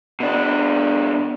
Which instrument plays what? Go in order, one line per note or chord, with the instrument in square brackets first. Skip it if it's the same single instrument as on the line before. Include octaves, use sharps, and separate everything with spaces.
[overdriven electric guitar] B2 D4